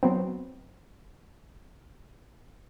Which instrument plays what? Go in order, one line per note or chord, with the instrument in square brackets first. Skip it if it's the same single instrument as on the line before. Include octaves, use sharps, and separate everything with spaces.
[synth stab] F#3 B3 C4